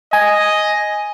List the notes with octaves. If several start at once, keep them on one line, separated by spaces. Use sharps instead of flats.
D#5 G#5